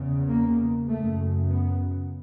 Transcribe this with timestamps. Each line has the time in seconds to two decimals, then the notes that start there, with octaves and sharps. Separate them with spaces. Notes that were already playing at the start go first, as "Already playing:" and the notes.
Already playing: E2 C#3
0.27 A#3
0.88 F#2 C#3 A3
1.49 B3